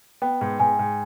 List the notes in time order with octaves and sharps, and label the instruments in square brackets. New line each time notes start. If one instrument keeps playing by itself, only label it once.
[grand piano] B3 [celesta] G5
[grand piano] G#2
[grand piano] G#2 [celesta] G#5
[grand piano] G#2